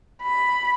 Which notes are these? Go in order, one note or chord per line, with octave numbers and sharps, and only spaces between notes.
B5